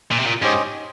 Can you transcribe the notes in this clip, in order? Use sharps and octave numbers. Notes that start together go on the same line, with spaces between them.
A#2
C3
A#2
G#2 C#4 G4 C5 D#5